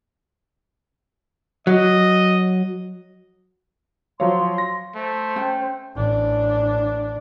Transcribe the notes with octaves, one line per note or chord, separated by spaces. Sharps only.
F#3 D#5
F3 F#3 C#5 F5 C6
A#6
A3 C5
C#4 G5
A1 D4